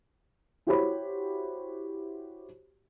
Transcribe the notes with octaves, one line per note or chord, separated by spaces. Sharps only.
E4 F#4 G4 C5 C#5 B5